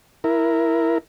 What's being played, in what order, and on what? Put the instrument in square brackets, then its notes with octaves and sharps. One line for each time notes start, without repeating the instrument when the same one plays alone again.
[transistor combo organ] E4 A#4